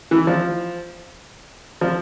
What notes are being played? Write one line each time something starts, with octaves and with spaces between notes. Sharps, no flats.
E3
F3
F3